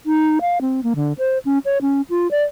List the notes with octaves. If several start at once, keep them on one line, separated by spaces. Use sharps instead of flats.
D#4
F5
C4
A#3
D3
C5
C#4
C#5
C#4
F4
D5